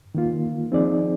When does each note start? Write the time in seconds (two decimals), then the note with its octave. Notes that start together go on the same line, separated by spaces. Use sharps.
0.15 D#3 A#3 F4
0.71 F3 C4 D#4 G#4 D5